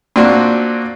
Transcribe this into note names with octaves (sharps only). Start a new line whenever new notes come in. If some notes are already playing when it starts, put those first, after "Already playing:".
A#2 C4 D4 F#4